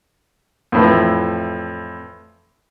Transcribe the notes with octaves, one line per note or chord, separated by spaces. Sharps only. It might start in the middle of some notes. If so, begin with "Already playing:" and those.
F2 A2 E3